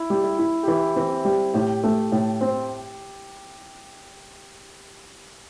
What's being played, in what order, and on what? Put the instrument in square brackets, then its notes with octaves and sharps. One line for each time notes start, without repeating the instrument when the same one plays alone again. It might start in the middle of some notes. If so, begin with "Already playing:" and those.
Already playing: [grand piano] E4
[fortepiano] G3
[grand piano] E4
[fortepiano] E4
[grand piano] G4
[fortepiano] E3 [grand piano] E4
[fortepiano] E3 [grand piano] C4
[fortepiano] G3
[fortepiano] A2 [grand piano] G4
[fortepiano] A3
A2
C4